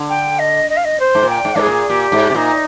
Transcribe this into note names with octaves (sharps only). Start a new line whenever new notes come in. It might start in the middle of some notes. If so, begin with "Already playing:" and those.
Already playing: D3
G5
D#5
D#5
F5
D#5
C5
G#2
A#2
G5
G#2
G#2 G#4
A#2
A#2 G4
G#2
C3
A#2 D#4